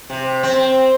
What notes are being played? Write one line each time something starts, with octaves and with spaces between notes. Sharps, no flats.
C3
C4